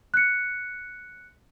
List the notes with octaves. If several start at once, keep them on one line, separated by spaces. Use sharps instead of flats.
F#6 C#7